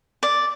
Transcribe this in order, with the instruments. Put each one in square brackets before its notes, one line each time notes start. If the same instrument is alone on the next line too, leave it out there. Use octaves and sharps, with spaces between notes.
[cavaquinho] D5